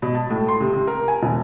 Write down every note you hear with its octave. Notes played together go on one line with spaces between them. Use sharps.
B2
A5
A2
C6
C3
C3
A#4
G#5
E1